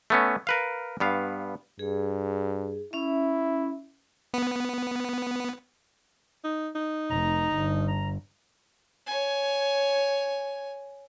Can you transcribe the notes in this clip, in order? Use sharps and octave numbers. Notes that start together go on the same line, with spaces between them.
A3 B3 C#4
A#4 B4 F5
G2 B3 F5
G2 G#4
C#4 E4 E5
B3
D#4
D#4
F1 A#5
G1
A#5
C#5 G#5